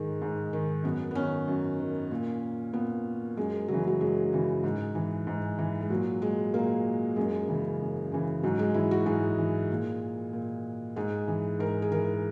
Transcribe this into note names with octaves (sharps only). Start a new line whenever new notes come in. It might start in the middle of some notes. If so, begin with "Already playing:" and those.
Already playing: G#2 D#3 G#3
G#2
D#3
F#2 B3
B3
D#3 C#4
F#2
D#3
A#2
A#2 B3
F#2 G#3
C#3 F#3
E3
G#3
F#3
F#2 G#3
C#3 E3
G#2
E3
G#2
E3
G#3
A#2 F#3
G#3
A#2 A#3
F#2 G#3
C#3 E3
F#2
C#3 E3
G#2 F#3
G#3
E3 E4
F#4
G#2 G#4
E3
A#2
A#2
G#2 G#4
E3
G#2 A#4
G#4
E3 A#4